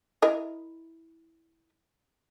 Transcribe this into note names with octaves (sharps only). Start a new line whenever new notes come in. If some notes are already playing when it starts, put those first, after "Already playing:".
E4 A#4 D#5